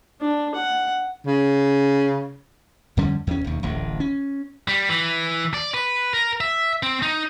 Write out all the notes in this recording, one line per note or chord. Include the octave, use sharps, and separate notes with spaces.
D4
F#5
C#3
F2 D3 G3 C#4
E2 C#4
E1 D#2
D1 A1
C#4
G3
E3
D5
B4
A#4
E5
C4
D#4